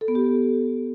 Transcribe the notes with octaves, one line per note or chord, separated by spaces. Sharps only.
A4
B3
G4